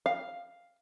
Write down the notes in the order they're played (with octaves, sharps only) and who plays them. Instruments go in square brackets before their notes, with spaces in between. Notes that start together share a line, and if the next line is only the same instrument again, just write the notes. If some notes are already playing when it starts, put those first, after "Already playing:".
[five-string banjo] F5